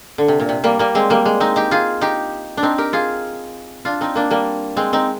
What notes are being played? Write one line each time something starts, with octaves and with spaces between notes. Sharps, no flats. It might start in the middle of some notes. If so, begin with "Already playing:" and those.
D3
C3
A#2
C3
G3 A#3
G3 A#3
G#3 C4
G3 A#3
G#3
C4 D#4
D#4 G4
F4 G#4
D#4 G4
D4
C4 D#4
G4 A#4
F4 G#4
D4 F4
C4 D#4
A#3 D4
G3 A#3
G#3 C4
C4 D#4